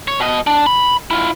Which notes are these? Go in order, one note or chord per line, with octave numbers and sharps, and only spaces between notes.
C#5
B2 D#5
D4
B5
E4 F4